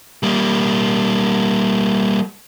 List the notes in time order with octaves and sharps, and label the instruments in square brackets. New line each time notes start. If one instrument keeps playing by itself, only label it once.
[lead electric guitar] G3 A#3